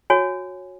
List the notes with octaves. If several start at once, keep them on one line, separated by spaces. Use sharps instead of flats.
F#4 C#5 G#5